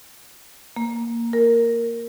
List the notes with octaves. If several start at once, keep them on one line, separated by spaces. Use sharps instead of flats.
A#3
A#4